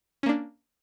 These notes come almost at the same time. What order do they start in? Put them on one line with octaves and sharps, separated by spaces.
C#4 A#3 D4